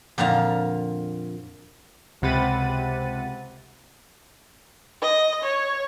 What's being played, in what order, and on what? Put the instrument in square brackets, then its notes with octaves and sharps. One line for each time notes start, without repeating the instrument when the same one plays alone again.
[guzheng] F2 A#2 D3 F5 A#5
[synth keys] C#2 C3 F#5 B5 A6 D#7
[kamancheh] D#5
C#5